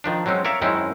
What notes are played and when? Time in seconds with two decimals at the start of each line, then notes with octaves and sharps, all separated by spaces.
0.04 D#3 F3 D4
0.26 F#3 G#3 C4 C#4
0.45 A#4 C#5 D5 E5 F5
0.61 F#2 D#3 G#3 C4 C#4 E4